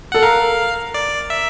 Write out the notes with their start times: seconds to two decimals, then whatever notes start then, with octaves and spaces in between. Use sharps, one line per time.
0.12 A4 F#5
0.22 A#4 F5
0.94 D5
1.30 E5